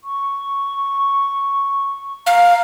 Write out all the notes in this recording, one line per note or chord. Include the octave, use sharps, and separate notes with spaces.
C#6
F5 A#5